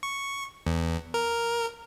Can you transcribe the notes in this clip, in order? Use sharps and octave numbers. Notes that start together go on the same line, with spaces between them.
C#6
E2
A#4